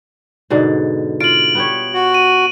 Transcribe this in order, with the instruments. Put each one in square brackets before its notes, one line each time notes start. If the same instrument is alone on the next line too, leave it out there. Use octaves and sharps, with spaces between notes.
[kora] G#2 B2 D3
[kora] F4 [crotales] D7 F#7
[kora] B3 G4 C#5
[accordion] F#4
[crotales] D#7